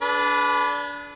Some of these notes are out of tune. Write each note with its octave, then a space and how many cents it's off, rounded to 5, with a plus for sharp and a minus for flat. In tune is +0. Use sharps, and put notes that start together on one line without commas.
D4 -20 G#4 +45 B4 +0